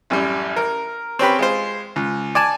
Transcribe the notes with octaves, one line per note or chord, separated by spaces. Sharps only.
A1 F#2 G3
A#4
C4 C#4 G4 B4
G#3 F4 C5
C#2
D5 G#5 A5